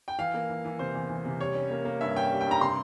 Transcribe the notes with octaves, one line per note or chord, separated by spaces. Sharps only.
G5
E3 F5
A#3
E3
E3
C3 C5
E2
E3
C3
G3 C#5
C#4
A#3
A#3
G2 E5
C#4 G5
G3
G5
G2 A#5
C3 C6